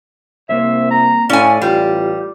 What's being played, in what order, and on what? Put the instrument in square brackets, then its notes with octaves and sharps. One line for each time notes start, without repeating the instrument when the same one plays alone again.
[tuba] C2 [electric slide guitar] A#3 C4 C#5 [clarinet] E5
[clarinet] A#5
[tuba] A2 [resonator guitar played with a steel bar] C#4 G#5 [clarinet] D5 [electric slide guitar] F5
[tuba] A1 [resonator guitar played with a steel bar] G3 [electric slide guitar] F4